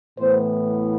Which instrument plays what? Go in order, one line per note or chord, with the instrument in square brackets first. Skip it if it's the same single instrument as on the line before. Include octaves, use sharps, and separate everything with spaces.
[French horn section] A2 E3 B3 C5